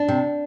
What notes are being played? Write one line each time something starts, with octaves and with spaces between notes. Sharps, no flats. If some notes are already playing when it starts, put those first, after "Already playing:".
Already playing: D4
C3